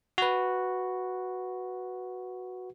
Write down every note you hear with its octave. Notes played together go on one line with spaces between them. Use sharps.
F#4 B4